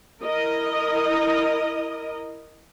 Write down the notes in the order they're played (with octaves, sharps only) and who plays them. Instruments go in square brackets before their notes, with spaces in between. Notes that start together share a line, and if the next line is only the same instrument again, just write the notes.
[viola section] E4 A#4 D#5